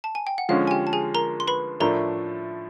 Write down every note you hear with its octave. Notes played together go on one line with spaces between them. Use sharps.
A5
G#5
G5
F#5
D3 F3 G#3 C#4 F5
G#5
G4 G5
A5
G#4 G#5
A#4 A#5
C6
B4 B5
A2 F3 A3 D4 A#4 A#5